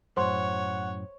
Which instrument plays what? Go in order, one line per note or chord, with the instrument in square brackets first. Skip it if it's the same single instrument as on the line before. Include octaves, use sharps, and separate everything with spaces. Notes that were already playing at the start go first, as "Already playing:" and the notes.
[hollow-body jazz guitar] F#2 A2 [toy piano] C5 C6 [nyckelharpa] C#5 [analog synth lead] F#5